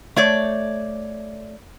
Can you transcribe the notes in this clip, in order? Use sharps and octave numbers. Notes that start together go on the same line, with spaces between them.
A3 C#5 D5